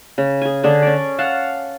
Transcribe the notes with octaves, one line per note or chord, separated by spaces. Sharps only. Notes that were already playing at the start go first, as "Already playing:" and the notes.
C#3
G#4 G#5
D3 D4 G#4
C#4 D5
F5 F#5 A5